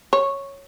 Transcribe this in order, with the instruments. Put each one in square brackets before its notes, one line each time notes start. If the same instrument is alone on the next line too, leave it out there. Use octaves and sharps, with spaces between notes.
[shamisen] C#5